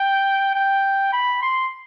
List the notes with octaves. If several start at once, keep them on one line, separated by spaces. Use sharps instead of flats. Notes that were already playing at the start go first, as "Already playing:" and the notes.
Already playing: G5
G5
B5
C6